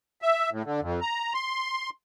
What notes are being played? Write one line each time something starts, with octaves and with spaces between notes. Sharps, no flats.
E5
A2
D3
F2
A#5
C6